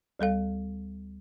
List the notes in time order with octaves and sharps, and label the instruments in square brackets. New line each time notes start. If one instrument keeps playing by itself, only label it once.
[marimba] D2 G3 A4 F5